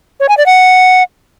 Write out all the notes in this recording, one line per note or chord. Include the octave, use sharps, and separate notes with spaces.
C#5
G#5
D5
F#5